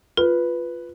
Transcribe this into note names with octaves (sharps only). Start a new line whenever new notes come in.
F4 B4